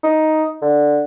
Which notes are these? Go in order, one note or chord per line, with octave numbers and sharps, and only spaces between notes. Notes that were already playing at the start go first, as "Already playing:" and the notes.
D#4
D3